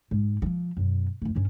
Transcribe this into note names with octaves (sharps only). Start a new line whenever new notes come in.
G#2
E3 F3
F#2 B2
E2 A3
G2 C#4